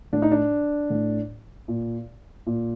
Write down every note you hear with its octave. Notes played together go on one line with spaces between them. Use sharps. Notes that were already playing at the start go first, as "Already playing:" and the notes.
A2 D4
D#4
D4
A2
A#2
A#2